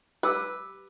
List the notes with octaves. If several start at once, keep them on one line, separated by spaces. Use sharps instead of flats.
G4 B4 D6 E6